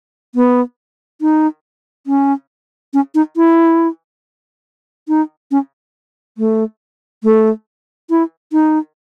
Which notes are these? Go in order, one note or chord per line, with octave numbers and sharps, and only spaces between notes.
B3
D#4
C#4
C#4
D#4
E4
D#4
C#4
A3
A3
E4
D#4